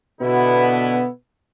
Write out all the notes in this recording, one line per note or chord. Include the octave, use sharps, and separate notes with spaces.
B2 D3 B3 E4